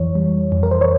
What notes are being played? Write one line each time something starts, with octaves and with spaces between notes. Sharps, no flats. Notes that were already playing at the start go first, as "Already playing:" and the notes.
Already playing: F2 E3 C#5
G3
F2
A#4
C5
C#5